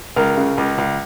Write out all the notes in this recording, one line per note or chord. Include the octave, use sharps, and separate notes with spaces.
C#2 A#4
C#3
C#2
C#2